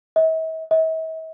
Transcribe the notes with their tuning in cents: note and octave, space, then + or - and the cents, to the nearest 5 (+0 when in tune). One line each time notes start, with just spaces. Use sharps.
E5 -45
E5 -45